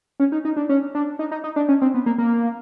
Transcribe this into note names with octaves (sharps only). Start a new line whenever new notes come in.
C#4
D#4
D#4
D4
C#4
D4
D#4
D#4
D#4
D4
C#4
C4
B3
A#3
A#3